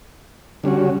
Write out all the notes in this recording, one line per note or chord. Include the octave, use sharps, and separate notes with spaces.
D3 G3 C#4 F#4